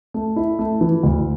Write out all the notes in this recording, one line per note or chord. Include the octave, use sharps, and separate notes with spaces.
A3
E4
A3
E3
D2